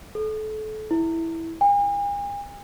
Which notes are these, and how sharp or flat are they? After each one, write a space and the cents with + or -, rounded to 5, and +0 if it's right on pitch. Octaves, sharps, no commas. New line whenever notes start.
A4 -30
E4 -5
G#5 -45